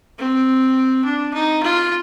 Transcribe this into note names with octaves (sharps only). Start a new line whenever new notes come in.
C4
D4
D#4
F4